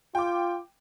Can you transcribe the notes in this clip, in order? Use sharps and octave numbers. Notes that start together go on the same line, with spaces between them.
F4 G5 D6